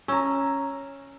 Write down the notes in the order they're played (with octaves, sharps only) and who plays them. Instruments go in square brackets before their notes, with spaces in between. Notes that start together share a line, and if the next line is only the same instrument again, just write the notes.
[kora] C#4 [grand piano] A#5 E6